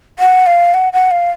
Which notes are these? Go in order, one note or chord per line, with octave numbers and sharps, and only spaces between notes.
F#5
F5
F#5
F#5
F5